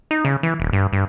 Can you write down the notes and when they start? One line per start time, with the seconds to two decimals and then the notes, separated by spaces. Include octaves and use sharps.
0.11 D#4
0.25 C#3
0.43 E3
0.60 D#1
0.73 G2
0.93 G2